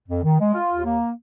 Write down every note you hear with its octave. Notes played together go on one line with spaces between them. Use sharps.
F2
D#3
G#3
F4
D#2
A#3